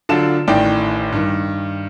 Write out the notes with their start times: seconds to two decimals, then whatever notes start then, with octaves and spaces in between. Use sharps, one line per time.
0.09 D3 F#3 D4 F4 A5 E7
0.48 A1 A2 D#3 D5 G5
1.12 G2 D#3